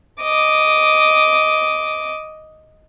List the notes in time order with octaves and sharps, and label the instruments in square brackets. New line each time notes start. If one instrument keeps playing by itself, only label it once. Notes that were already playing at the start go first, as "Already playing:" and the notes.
[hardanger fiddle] D#5 D6